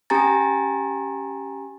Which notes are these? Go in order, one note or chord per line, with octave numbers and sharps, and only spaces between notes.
C#4 G4 G#5 A#5 A6